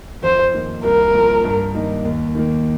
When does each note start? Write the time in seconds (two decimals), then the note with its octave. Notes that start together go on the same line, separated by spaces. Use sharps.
0.23 F2 C5
0.53 D#3 A#3 F4
0.84 C2 A#4
1.14 A#2 F3
1.44 G2
1.74 D#3 A#3 D#4
2.05 D#2
2.35 D#3 A#3